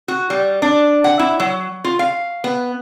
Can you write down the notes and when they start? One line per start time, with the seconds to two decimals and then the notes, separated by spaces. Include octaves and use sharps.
0.08 F#4
0.30 G3
0.62 D4
1.04 F#5
1.19 E4
1.40 F#3
1.84 F4
1.99 F5
2.44 B3